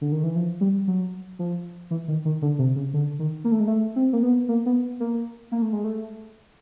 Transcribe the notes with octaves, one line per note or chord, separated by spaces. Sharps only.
D3
D#3
E3
F3
G3
F#3
F3
E3
D#3
D#3
D3
C3
C#3
D3
D#3
A#3
A3
G#3
A3
C4
A#3
B3
A#3
B3
A#3
A#3
A3
G#3
A3